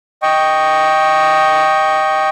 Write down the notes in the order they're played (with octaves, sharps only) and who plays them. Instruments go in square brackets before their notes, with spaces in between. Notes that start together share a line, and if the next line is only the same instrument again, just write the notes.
[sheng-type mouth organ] D#5 G5 C#6